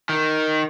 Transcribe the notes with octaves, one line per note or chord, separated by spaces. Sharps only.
D#3